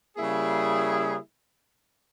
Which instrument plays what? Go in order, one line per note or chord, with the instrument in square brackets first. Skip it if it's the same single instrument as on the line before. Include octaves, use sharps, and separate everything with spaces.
[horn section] C#3 G3 A#3 E4 G#4